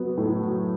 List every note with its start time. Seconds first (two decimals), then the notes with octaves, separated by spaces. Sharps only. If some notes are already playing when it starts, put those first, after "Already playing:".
Already playing: F#3 B3
0.17 A2
0.40 F#3